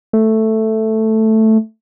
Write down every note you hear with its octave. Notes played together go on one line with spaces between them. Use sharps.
A3